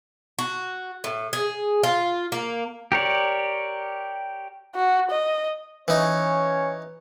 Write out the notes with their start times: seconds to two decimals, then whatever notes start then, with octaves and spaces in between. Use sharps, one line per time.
0.39 F#4
1.04 A2
1.33 G#4
1.83 F4
2.32 A#3
2.92 G4 A#4 C#5 D5
4.75 F#4
5.11 D#5
5.88 E3 C#4 D#4 C#5